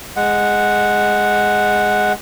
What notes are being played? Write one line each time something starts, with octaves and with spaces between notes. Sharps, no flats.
G#3 F#5